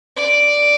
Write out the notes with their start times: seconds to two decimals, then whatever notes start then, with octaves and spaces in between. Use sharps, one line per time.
0.17 D5